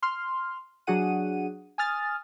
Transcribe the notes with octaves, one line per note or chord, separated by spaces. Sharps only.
C6 F6
F#3 D4 F#4 G#4 F#5 D#7
G#5 D#6 F6 A6